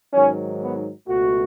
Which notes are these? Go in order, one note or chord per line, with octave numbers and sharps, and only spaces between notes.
G#2 D#3 F#3 C#4
B3
C#2 B2 A3 F#4